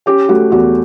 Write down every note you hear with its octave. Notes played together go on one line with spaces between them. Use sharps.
C#4 G4
A3 F#4
E2 F#4